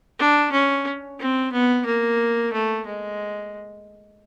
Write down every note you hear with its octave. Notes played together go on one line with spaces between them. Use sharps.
D4
C#4
C4
B3
A#3
A3
G#3